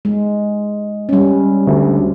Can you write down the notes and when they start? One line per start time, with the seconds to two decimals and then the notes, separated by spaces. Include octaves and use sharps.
0.05 G#3
1.09 G3 C#4
1.67 D2